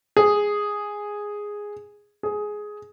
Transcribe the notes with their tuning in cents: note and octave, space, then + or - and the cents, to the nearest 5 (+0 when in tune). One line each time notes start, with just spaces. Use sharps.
G#4 -5
G#4 +10